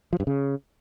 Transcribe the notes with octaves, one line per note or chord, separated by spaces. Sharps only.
F3
G2
C#3